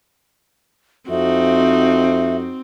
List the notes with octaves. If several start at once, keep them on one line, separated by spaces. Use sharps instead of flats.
F2 C4 D#4 F#4 E5